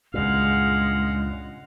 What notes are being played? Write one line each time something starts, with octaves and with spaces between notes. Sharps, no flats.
C#2 G2 A#2 G#3 F5 F#5